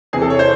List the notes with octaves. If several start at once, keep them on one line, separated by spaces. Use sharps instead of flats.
E2 C3 E3 G#4
A4
C#5
C5